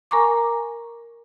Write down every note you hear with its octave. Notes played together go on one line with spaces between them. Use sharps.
A#4 G#5 A#5 C#6 D6